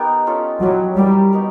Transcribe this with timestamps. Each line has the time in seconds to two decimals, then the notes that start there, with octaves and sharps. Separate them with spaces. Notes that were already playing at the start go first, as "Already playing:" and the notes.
Already playing: B3 D#4 G4 A#4
0.27 C#4 F4 A4
0.62 F#3 C#4 E4 G4
0.97 G3 E4 G4 A#4
1.33 B3 D#4 F#4 A#4